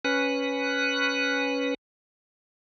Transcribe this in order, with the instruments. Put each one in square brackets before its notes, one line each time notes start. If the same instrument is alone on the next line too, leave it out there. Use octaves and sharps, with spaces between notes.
[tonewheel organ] C#4 B4 F#6